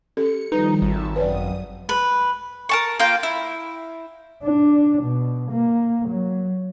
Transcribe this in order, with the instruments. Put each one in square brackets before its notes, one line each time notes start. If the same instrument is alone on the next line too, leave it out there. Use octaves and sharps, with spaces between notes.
[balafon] C#4 G4 A4 [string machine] C#7
[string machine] D#3 F3 G3 [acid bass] D#4 [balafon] B4
[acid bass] G#1 [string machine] E5 A5
[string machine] F#2 D#6 [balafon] B4 C#5 D5
[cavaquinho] B4
[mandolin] A#4 A5 C#6
A#3 F4 F5 G5
E4
[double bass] D4
B2
A#3
F#3